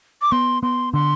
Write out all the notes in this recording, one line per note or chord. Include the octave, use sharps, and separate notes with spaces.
D6
B3 C6
B3 C6
D3 C6